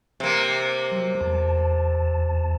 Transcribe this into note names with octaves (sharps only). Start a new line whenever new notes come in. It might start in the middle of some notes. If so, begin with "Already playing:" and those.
C3 A#3
F#3
E2 A5